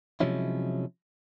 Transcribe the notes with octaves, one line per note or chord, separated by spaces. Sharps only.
C3 F3 F#3 G#3 C#4 E4